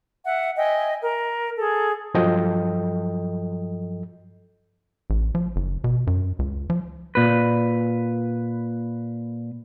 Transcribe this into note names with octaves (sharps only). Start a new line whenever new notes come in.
E5 F#5
D#5 E5 G5 G#5
A#4
G#4 A4
G2 F3 F#3 A4 D#5 G5
A1
F3
F#1
B2
F#2
C#2
F3
A#2 B4